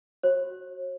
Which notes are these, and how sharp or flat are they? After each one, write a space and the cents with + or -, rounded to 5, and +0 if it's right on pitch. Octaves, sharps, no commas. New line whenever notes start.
F#4 +0 C#5 -45